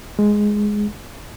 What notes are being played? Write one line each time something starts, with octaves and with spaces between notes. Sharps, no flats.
G#3